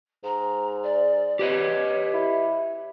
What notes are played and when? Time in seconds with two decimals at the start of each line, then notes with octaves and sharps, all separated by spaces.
0.24 G#2 A#5
0.82 D5
1.39 G4 B4 C#5 D#5
2.13 E4